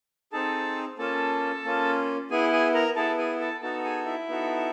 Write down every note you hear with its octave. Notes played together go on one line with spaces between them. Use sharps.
C4 D#4 G#4 A4 A5
A#3 C#4 F4 A4 A5
A#3 C#4 F4
B3 E4 G#4 G#5
G#4 G#5
A#4 A#5
B3 E4 G#4 A4 A5
G#4 G#5
A4 A5
B3 D#4 F#4 A4 A5
G#4 G#5
E4 E5
B3 D#4 F#4 A4